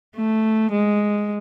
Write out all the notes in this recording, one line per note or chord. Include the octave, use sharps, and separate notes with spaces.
A3
G#3